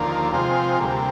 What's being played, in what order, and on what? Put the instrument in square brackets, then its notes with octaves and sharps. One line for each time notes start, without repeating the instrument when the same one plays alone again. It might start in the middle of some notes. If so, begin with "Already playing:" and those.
Already playing: [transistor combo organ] D#2 D3 F3 A#3
C3 F3 G#3 C4 F4
D2 C3 G3 A#3